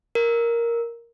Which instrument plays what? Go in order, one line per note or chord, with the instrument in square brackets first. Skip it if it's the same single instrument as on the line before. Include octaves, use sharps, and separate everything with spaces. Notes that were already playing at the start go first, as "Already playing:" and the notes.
[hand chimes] A#4